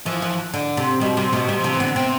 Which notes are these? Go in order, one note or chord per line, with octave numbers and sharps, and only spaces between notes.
E3 F3
E3
D3
C3
B2 G3
C3 G3
B2 A3
C3 G3
F3
C3
E3
D3 B3
C3 C4